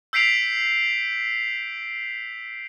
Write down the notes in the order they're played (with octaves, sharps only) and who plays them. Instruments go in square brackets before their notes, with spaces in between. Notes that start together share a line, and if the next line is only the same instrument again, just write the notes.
[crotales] E6 G6 B6 C7 D7 F7